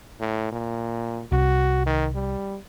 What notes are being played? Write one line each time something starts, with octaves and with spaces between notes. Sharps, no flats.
A2
A#2
C2 F#4
D#3
G3